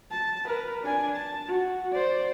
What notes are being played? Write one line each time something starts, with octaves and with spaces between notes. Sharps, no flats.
A5
A#4 B4
D4 G#5
A5
F#4
C5 D5